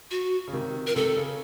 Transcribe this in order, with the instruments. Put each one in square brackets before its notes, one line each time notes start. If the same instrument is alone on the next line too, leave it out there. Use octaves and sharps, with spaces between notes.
[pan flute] F#4
[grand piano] C#3
C3 D#3
[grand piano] F3 [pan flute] A#4
[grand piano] C3 D#3 [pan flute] A4
[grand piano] C#3